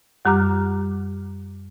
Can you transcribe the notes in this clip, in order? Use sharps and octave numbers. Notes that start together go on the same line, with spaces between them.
F#2 G3 G4 A#5 D6 F6